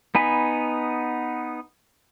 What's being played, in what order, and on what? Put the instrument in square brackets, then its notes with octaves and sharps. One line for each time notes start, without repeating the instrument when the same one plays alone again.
[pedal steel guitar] B3 D#4 G#5 B5